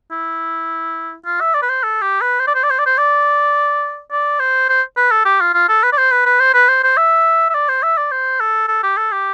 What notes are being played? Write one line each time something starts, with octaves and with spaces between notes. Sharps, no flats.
E4
F4
E5
D5
B4
C5
A4
G4
B4
C5
D5
C5
D5
C5
D5
C5
D5
D5
C5
C5
B4
A4
G4
F4
F4
A4
B4
D5
C5
B4
B4
C5
B4
C5
C5
E5
E5
D5
C5
E5
D5
C5
A4
A4
G4
A4
G4